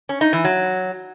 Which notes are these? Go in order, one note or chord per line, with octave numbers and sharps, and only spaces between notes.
C#4
D#4
E3
F#3